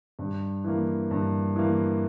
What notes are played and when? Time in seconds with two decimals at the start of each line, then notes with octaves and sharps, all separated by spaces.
0.19 G2
0.64 E3 A#3
1.11 G2
1.56 E3 A#3